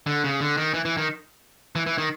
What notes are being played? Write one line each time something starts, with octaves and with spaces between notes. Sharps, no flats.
D3
C#3
D3
D#3
E3
E3
D#3
E3
E3
D#3